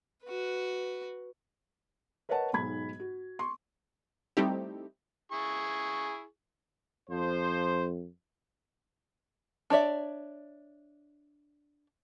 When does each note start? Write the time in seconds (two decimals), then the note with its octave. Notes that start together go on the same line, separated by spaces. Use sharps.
0.24 F#4 B4
2.29 A#4 B4 C#5 D#5 F#5 A5
2.53 B1 G#2 B5 G#6
3.00 F#4
3.39 C6 C#6
4.37 G3 A3 C4 D#4 E4 G4
5.32 E4 G#4 C#6
7.09 F2 F3 C5
9.70 D4 C#5 D5 E5